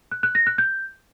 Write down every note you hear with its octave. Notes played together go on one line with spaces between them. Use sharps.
F#6
F#6
A#6
F#6
G6